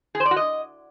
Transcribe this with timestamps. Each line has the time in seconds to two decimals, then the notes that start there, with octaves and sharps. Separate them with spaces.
0.15 G#4
0.20 C5
0.26 D5
0.31 F#4
0.36 D#5